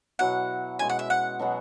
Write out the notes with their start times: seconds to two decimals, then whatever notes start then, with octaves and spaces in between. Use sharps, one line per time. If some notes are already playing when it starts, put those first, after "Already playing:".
0.19 B2 F#3 E4 F#5
0.79 B2 G#3 C#4 G#5
0.90 F#5
0.99 E5
1.10 F#5
1.39 B2 F#3 B3 G#4